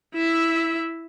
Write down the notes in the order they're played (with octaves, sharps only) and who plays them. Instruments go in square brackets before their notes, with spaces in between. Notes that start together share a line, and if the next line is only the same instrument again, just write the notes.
[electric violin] E4 E5